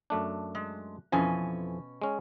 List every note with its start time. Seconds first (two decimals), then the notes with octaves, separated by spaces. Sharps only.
0.10 F#2 A3 D4
0.55 G#3
1.12 F2 B2 E3 F3 C#4 G#5
2.02 G#3 C#4